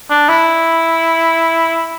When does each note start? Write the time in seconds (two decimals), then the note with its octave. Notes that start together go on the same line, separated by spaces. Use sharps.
0.11 D4
0.29 E4